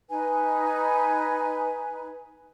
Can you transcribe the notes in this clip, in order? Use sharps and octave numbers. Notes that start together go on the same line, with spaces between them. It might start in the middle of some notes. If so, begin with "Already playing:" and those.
D#4 B4 G#5